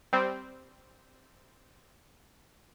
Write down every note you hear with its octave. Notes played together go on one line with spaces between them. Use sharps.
G3 C4